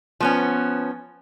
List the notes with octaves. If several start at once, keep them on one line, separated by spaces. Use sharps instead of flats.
F3 B3 C#4